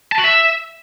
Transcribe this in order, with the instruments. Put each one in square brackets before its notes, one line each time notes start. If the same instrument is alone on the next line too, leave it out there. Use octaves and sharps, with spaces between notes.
[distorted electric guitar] A5
F#4
E5